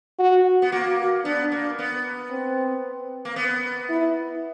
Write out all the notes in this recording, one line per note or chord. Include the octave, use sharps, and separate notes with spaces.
F#4
B3
A#3 F#4
B3 D4
A#3
B3
C4
A#3
B3
E4